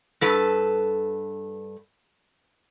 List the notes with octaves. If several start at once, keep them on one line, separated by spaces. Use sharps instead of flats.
G2 A4 B4